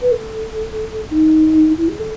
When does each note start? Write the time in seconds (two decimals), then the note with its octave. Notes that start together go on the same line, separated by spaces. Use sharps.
0.02 B4
0.11 A4
1.10 D#4
1.77 E4
1.88 G#4
1.99 A4